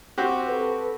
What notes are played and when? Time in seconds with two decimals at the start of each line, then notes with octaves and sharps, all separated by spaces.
0.18 C4 F#4 G4
0.48 A4 B4